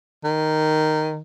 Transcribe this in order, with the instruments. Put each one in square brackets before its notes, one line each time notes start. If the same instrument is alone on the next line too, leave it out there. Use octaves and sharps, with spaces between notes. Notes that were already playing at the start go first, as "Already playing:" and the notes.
[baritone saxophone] D#3